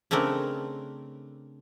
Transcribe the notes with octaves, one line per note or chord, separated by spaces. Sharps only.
C#3 A3 C4 D4 A#4